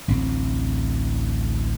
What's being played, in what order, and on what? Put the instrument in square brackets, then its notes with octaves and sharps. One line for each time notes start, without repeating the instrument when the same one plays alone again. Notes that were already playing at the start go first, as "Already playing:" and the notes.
[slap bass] A1 D2 F#3 C4